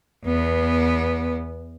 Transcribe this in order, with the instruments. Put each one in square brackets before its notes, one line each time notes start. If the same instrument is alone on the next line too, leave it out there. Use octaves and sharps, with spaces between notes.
[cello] E2 B3